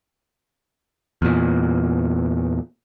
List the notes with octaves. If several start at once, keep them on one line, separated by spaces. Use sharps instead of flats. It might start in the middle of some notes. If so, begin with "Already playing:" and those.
E2 A#2